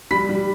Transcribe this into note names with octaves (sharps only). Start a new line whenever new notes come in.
G3 B5 B6
G3